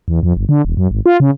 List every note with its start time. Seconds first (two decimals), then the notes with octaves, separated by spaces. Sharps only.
0.08 E2
0.23 F2
0.37 G1
0.49 D3
0.65 E1
0.77 F#2
0.91 G#1
1.06 F4
1.20 C#3